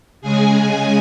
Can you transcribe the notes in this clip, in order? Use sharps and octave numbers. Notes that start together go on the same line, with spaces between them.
C#3 G#3 G#4 G#5